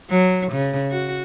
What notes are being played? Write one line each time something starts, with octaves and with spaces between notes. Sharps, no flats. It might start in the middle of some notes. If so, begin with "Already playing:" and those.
F#3
C#3
F#4